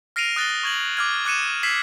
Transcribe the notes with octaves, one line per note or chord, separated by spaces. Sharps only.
F6 A#6 C7 D7 D#7 F7
D#6 F#6 A6 A#6 G7
C#6 G#6 F#7
D6 F6 G#6
D6 F#6 G#6 C#7 D#7 E7
E6 G#6 B6 C7 E7 F#7